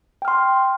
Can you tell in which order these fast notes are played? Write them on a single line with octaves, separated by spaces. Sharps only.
G5 F6 C6